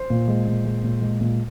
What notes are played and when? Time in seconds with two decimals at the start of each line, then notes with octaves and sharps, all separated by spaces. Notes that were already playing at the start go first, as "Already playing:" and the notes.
Already playing: C5
0.10 A#2
0.28 G#3
0.47 A#2
0.65 G#3
0.83 A#2
1.02 G#3
1.21 A#2